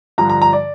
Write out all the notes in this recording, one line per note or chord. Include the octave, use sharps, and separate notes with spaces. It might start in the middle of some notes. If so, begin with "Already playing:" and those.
G2 D3 F3 A#5
A#5
A#5
D5